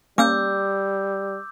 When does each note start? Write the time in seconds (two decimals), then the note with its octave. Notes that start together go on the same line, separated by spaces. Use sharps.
0.18 G3 A#3 C#4 D6 E6 G6